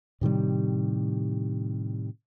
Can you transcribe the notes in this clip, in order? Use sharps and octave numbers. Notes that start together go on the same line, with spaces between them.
A2 C3 D#3 G3